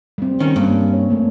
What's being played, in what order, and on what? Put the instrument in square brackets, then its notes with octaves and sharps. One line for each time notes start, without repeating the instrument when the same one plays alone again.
[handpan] G3 C4
[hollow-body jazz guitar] D#3 C#4
[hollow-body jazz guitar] G2 [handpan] G3 A#3 C#4
[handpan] C#5
A3 A#3